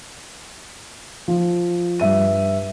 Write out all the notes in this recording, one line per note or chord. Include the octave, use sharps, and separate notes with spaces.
F3
G2 E5 D#7